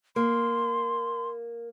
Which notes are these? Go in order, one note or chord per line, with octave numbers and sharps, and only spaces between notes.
A#3 C6